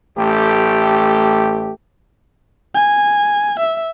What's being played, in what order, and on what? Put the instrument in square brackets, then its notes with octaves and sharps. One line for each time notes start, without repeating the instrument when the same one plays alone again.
[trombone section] A1 A3 G4
[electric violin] G#5
E5